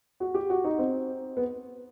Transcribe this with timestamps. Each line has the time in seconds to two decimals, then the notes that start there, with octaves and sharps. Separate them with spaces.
0.20 F#4
0.34 G4
0.50 F#4
0.64 D#4
0.79 C4
1.37 B3